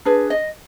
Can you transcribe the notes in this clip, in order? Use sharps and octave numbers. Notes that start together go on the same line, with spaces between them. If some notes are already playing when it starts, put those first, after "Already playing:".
D4 G#4 B4
D#5